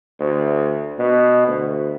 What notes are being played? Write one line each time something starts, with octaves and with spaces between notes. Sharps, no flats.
D2
B2
D2